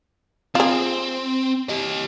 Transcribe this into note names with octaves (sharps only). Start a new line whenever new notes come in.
C4 F4 G#4
G4 D#5